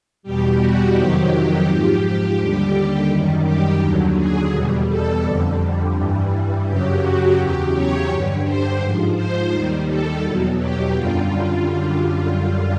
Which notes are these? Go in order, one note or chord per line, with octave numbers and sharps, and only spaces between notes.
E2 B2 G3 G4
F#4
F2 C3 D#3 F#3 G4
G#2 F3 G4
D#2 D3 G3 G4
F#2 D#3 G3
G4
D#2 D3 F#3
G#4
E2 B2 G3
A4
F2 D3 G3
G2 E3 G3
F#2 C#3 F#3 G4
F#4
E2 C#3 F#3 G4
C#5
G2 D3 G3
C5
G#2 F3
C5
D#2 D#3 G3
A4
E2 B2 F#3
G4
F#2 D3 G3 F4